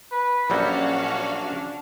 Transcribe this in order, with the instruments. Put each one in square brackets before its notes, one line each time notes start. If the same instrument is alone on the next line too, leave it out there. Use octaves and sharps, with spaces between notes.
[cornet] B4
[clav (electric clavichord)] A#1 F#3 G3 [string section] C#4 F#4 F5 [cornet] D4